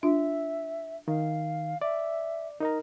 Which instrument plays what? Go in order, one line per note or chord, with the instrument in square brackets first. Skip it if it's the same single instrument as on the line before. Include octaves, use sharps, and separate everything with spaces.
[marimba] D4 F4 [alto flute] E5
[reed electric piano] D#3 [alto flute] F5
[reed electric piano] D5 [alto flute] E5
[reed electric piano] D#4 D#5 A#5 [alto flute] A#4